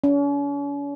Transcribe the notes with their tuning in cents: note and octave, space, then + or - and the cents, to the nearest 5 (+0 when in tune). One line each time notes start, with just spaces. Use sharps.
C#4 +40